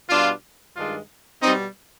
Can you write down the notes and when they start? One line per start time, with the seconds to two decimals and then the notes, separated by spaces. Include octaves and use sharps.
0.09 B2 G3 D4 F4
0.76 G2 D#3 G#3 D4 F4
1.42 B2 G3 C4 D#4